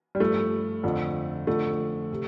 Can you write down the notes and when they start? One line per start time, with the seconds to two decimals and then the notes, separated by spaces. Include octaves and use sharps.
0.15 G3
0.20 G2 F3 A3
0.83 F2 D3 F3
1.47 F2 D3 F3 A3
2.12 C3